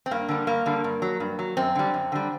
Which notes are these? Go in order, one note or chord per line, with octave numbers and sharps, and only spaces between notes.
C4
G2 A#3
D3 G3
G2 A#3
D3 G3
G2
F#3
G2
F#3
F#2 C4
D3 G3
F#2
D3 G3